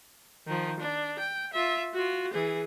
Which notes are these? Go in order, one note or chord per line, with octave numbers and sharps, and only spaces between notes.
D#3 F3
D4
G5
F4 E5
F4 F#4
E3 G#4